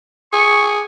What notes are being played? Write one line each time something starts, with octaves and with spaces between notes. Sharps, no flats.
G#4 C#6